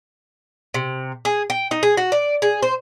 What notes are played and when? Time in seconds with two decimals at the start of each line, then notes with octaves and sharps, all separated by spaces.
0.74 C3
1.25 G#4
1.50 G5
1.71 D#4
1.83 G#4
1.97 F#4
2.12 D5
2.42 G#4
2.62 C5